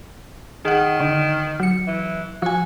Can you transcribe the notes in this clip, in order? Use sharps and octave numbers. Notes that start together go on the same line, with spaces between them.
D#3 G#4 F#5
D3
F#3 C#7
E3
F3 F#4 G#5